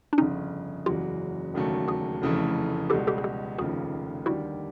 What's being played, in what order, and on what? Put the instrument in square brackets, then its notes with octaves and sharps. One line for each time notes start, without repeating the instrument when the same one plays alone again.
[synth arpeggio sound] D4
[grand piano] G1 F2 C#3 [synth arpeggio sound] C#4 D#4
[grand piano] F#1 E2 C#3 F#3 [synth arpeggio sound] F4 G4
[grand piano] E1 D#2 C#3 F#3 A3
[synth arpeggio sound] F#4 G#4
[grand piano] F1 F2 C#3 E3 A3
[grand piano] C#2 B2 G3 [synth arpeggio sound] G4 A4
[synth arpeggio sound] G4 A4
G#4
G4 A4
[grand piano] F1 D#2 C#3 F3 [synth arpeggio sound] F#4 G#4
[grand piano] D#2 D3 G3 [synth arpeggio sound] E4 F#4